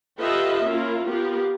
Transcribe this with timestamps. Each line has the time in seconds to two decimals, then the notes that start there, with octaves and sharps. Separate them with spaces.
0.18 F4 G4 A4 B4 D#5 E5
0.64 A#3 C#4 E4 F4 A#4
1.07 B3 F4 G4 A#4